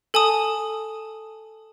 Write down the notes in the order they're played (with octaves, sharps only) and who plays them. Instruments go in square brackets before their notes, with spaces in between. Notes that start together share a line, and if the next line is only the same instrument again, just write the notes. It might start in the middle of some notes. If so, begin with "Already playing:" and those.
[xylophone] A4 G#5 A5 D#6